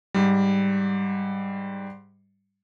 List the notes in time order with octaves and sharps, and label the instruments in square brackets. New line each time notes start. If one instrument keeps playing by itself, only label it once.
[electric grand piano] G#2 G3